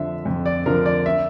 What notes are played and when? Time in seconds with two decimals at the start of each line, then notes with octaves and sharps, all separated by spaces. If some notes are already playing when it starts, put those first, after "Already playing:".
Already playing: F2 D3 F3 E5
0.25 F2
0.46 D5
0.66 D3 F3 A#4
0.86 D5
1.06 E5